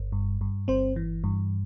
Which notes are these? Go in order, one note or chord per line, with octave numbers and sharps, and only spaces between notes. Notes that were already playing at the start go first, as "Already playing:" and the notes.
Already playing: G1
G2
G2
G1 C4 C5
E3
G2